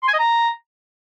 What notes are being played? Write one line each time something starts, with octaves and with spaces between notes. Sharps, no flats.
C6
G#5
D#5
A#5